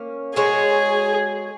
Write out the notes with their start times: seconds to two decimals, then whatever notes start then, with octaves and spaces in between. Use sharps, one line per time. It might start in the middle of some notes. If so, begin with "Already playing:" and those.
Already playing: A#3 C#4
0.36 G#3 F#4 G#4 C#5